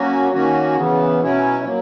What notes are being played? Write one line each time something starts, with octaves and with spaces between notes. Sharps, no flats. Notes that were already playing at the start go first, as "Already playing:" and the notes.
Already playing: F#3 A#3 C#4 F#4
D#3 A#3 C#4 F#4
C#3 E3 B3
B2 F#3 C#4 E4
F#3 A#3